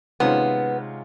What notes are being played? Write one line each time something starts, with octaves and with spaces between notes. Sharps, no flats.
C3 D#3 G#3 B3 C#4 F4